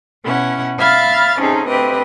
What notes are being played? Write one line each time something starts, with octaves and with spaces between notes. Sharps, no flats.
B2 C#4 E4 F#5
E5 F5 B5 F6 A6
C3 C#4 D#4 G#4 A4
D2 C4 G4 B4 D#5